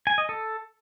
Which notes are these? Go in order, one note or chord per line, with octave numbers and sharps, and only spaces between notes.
G#5
D#5
A4